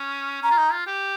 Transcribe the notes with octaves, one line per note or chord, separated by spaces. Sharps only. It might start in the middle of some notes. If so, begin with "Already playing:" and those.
Already playing: C#4
C#4 A#5
F4
D#4
F4
G4